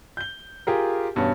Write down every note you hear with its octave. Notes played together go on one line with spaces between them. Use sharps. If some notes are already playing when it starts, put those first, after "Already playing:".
G6 G7
F4 G4 G#4 A#4
E2 G2 B2 C#4